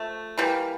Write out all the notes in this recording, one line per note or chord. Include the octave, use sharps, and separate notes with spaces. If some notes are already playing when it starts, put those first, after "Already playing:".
Already playing: F3 A3
E3 G3 A#3